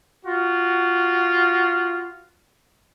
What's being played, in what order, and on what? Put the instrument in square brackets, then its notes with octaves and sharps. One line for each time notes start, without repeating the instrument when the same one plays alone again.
[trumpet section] F4 F#4